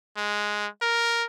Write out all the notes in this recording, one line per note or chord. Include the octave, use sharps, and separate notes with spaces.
G#3
A#4